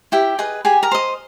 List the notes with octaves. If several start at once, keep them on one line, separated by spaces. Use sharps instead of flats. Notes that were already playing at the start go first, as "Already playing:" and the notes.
E4 G4 G5
G#4 B4 D#5
G4 G#4 G#5
A#4 A#5
C5 D#5